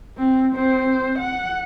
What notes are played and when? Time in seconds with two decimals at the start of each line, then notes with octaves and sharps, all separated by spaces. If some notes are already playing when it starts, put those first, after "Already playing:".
0.18 C4
0.55 C4 C5
1.18 F#5